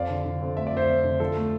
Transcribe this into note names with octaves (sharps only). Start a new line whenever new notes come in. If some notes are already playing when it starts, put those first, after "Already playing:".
Already playing: F2 D5 F5
D3
D3
F2
A3 E5
D5
F2 C5 E5
F2
D3
F3 A4
A3